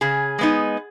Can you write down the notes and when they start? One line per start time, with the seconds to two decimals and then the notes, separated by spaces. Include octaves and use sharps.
0.01 C#3 G#4
0.39 G#3 B3 D#4